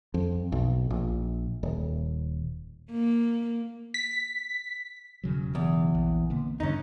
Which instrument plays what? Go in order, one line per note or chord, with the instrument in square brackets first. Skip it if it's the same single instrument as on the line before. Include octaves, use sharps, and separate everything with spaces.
[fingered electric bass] F2
B1
A#1
D#1
[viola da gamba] A#3
[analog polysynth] B6
[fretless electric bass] E1 C#3 F#3
[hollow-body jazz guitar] E2
[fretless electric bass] A#1
D3 A#3 B3
[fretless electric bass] E2 G2 D3 [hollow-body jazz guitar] C#4 D#4